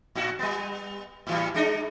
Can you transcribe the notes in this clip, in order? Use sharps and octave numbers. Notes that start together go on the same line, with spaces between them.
A2 F#4
G3 B3
A2 E3 G3
G#3 D4 D#4